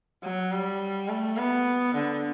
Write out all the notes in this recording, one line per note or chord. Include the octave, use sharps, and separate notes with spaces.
F#3
G3
A3
B3
D3